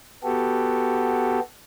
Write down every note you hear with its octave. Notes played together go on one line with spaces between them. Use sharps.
B3 F#4 G4 A4